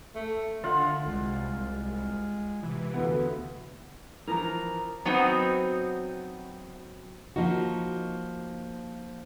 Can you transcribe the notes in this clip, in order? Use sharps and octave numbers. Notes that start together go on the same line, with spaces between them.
A3
D3 D#3 F4 F#5
C2 G#3
C3 E3
D2 B3
E3 F3 A#4 A#5
F#3 B3 C4 D#4 F#4
F3 A#3 D#4 F#4